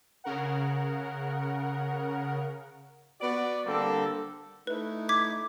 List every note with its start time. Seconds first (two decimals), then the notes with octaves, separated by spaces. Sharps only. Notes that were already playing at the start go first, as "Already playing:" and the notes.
0.24 C#3 A#4 F#5
3.21 B3 F#4 D5
3.66 D3 G3 A#3 C4 A4
4.67 A3 D#4 E4 B4
5.09 D6 G#6 B6